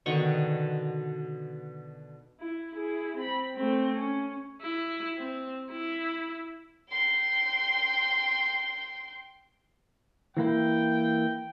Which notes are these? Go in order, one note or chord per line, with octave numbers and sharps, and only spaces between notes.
B2 D3 D#3 C#6
E4
E4 G#4
C4 B5
A3 C4
C#4
E4
C4
E4
G5 C6
E3 A#3 E4 G5